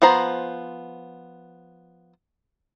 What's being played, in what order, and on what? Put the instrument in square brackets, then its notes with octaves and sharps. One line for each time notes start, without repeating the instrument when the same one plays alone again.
[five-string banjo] F3 B3 C5 A#5